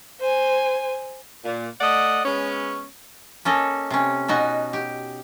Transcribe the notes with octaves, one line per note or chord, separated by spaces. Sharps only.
C5 G#5
A#2
A3 D5 D#5 F#5
G#3 B3 C#4
A#3 C#4 A4 D#5
C3 C#4
B2 D#4 F#4 G#5
G4